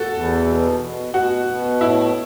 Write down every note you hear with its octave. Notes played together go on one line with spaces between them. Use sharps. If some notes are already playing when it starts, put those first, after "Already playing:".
Already playing: F#4 A4
E2
B2
B2
B2 F#4
B2
A2 E4